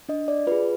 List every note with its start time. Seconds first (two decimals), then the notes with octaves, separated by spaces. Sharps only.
0.09 D4 D#5
0.28 D5
0.47 F4 G#4 B4